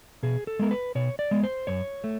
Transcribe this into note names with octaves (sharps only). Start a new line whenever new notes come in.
B2 G#4
A4
G#3 B3 A#4
B4
B2 C#5
D5
G#3 B3
C5
F#2 C#5
A3